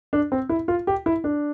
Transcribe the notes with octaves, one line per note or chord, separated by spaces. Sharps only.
D4
C4
E4
F4
G4
E4
D4